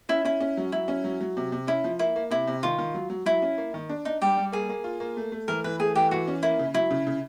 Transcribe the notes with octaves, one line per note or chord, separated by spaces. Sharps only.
C#4 E4
C#4 E4
C#4
F#3
F#3 E4
C#4
F#3
F#3
C3
C3
C#4 E4
F3
A#3 E4
A#3
C3 E4
C3
D#3 F4
D#3
F#3
F#3
F#3 E4
C#4
A#3
D#3
D4
D4 D#4
G3 G4
G3
A#3 G#4
A#3
F4
A#3
A3
A3
E3 A#4
E3 B4
A3 G#4
E3 G4
E3 F#4
C#4
A#3 E4
C#3
F#3 E4
C#3
C#3